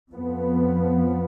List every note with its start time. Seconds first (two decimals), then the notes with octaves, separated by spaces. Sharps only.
0.12 F2 F3 B3